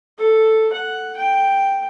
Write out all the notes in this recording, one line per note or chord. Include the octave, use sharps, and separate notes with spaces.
A4
F#5
G5